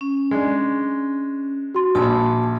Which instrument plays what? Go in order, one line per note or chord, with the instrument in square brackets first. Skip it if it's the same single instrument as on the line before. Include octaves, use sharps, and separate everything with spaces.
[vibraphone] C#4
[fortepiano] G#3 D4
[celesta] F#4 C6
[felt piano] A#1 [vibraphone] A5 B5 D6